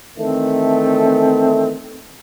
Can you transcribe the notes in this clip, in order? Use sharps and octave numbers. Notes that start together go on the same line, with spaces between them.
D#3 E3 A3 C4